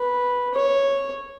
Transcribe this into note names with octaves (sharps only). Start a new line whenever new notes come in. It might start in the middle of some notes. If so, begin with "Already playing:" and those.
Already playing: B4
C#5